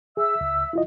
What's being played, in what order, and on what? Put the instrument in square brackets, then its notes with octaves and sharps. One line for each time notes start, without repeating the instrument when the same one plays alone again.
[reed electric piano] G#4 [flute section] E5 E6
[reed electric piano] C#2
E4 F4 D#5